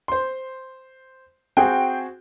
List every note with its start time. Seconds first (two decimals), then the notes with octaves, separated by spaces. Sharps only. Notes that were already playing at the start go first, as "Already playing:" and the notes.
0.08 C5 C6
1.57 C4 F#4 G#4 G5